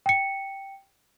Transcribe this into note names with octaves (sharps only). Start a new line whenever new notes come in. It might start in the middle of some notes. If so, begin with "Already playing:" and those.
G5 C#7